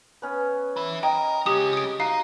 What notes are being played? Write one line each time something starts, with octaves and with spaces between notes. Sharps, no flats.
B3 C#4
E4 B4
A#4 D#5 G5
G#3 C#4 G4 D#6
D#6 D7
D#4 F#4 F5